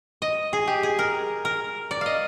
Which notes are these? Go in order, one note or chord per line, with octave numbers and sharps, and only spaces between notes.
D#5
G#4
G4
G#4
A#4
A#4
D5
D#5 F5